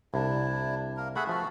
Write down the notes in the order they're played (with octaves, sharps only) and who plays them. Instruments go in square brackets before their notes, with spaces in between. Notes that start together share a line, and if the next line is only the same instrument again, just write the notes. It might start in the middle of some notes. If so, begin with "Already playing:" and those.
[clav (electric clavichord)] C2 [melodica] D4 E4
[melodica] A#3 A#4
[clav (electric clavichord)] A3 G#4 [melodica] E5 F#5 B5
[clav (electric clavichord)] F3 [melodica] A3 F#4